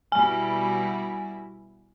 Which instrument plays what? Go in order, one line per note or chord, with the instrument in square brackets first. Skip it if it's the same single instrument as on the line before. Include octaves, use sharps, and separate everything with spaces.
[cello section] B2 G3 E4 [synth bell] G#5